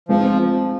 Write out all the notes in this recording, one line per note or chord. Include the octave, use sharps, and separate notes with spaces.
F3 G#3 C4 D#4